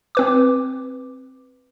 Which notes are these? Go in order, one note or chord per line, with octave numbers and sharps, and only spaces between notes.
C4 B4 D6